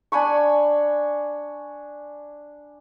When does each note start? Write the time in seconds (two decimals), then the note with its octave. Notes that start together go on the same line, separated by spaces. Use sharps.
0.12 D4 G#5 B5 C#6